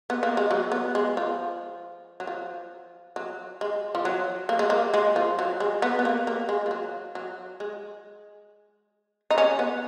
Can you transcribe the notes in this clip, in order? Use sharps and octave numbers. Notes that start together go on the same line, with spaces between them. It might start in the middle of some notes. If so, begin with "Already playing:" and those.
B3
A#3
G#3
F#3
B3
G#3
F3
F#3
F3
F#3
G#3
F3
F#3
A#3
G#3
A#3
G#3
F3
F#3
G#3
B3
B3
A#3
A#3
G#3
F3
F#3
F#3
G#3
D#4
C#4
B3